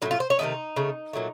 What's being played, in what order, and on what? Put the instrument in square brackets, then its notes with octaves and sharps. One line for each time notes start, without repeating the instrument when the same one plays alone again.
[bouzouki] A2 F#3 A3 D#4
F4
C5
C#5
C3 D#3 F#3 A3 D#4
C#3 A3
A#2 F#3 A3